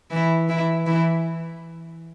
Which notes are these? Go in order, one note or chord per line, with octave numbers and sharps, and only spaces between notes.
E3 E4
E3 E4
E3 E4